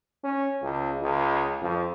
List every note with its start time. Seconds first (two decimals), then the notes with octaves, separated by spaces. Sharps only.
0.24 C#4
0.62 C#2
1.01 C#2
1.62 F2